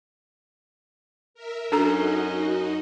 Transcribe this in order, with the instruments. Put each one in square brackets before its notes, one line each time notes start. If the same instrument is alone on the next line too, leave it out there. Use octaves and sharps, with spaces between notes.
[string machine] A#4 E5
[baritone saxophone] F#2 [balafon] D4 A4 A#5 [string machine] D#4 F#4 D#5